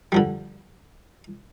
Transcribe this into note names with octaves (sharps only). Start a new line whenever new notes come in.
D3 F3 G3